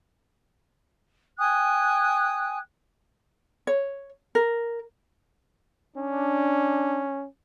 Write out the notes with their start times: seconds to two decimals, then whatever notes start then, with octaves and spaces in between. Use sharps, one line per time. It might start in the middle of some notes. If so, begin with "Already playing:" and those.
1.38 G5 G#5 D#6 F#6
3.67 C#5
4.35 A#4
5.97 C#4 D4